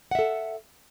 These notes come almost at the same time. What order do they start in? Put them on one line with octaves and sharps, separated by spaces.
F#5 E5 A4